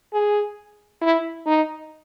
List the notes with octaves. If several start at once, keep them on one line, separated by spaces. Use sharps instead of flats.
G#4
E4
D#4